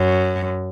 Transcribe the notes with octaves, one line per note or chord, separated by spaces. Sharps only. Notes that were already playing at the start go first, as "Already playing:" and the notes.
Already playing: F#2